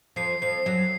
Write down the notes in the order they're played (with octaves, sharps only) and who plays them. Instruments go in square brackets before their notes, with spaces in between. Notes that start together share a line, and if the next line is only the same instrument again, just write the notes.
[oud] F2 F3 [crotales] C7
[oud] F2 F3 [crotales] C7
[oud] F#2 F#3